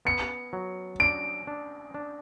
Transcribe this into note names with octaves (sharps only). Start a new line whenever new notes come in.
B3 C#7
F#3
D4 D7
D4
D4